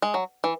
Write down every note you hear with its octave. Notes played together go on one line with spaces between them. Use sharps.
G#3
F#3
E3